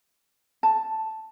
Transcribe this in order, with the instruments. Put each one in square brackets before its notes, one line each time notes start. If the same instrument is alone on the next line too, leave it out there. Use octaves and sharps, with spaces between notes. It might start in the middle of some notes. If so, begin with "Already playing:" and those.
[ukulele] A5